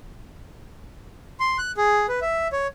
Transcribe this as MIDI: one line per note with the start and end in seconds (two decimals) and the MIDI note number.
1.40 1.58 84
1.58 1.72 90
1.77 2.06 68
2.09 2.20 71
2.22 2.48 76
2.52 2.67 73